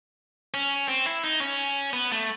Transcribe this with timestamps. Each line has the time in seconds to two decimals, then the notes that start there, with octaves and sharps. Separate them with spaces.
0.54 C#4
0.88 C4
1.06 E4
1.24 D#4
1.41 C#4
1.93 B3
2.12 A3